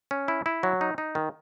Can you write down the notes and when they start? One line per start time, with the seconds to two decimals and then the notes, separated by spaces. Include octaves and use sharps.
0.11 C#4
0.28 E4
0.46 E4
0.63 F#3
0.81 D#4
0.98 D#4
1.15 D#3